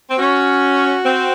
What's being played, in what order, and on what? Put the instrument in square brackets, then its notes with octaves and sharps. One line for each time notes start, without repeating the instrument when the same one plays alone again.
[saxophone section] C4
[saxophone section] C#4 [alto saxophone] F#4
[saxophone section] C4